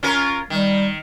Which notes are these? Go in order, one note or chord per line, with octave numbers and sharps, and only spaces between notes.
C#4 F4 A#4
D#3 G3